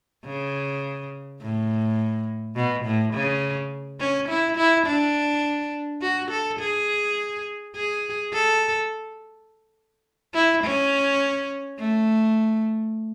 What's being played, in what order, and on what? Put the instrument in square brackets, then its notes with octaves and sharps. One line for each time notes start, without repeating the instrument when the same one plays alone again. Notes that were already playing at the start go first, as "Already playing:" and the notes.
[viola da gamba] C#3
A2
B2
A2
C#3
C#4
E4
E4
D4
F#4
A4
G#4
G#4
A4
E4
C#4
A3